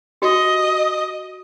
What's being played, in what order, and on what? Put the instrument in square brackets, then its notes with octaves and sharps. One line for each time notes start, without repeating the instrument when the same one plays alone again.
[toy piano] F#4 G4 [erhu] D#5